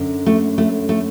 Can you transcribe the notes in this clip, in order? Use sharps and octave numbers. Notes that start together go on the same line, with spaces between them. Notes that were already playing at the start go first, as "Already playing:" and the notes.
Already playing: F#2 D3
A3
A3
A3